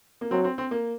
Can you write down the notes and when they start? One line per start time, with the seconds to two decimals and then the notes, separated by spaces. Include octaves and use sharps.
0.21 A#3
0.31 F#3 C4
0.44 C4
0.58 C4
0.71 A#3